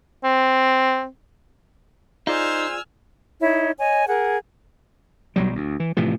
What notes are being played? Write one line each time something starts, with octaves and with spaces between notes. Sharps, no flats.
C4
D#4 F4 G#4 C5 D5 G#5 E6 F6
D#4 E4 C#5
C#5 D#5 G#5
G#4 A#4 F#5
B1 F#3 G3
D2
E3
A2 C3 E3 F3